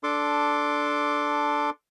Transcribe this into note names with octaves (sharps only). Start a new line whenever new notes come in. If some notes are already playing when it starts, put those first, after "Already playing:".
D4 A4 C6 D6